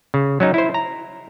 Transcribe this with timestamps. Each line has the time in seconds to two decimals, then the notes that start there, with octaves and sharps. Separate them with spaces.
0.14 C#3
0.40 F#3 C#4 D#4
0.54 E4 C5
0.74 A#5